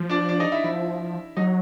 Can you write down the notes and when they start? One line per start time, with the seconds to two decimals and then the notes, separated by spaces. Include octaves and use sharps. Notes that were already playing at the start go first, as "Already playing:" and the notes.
Already playing: F3
0.09 D4 D5
0.29 D4 D5
0.40 D#4 D#5
0.52 E4 E5
0.64 F3 E4 E5
1.37 F#3 D#4 D#5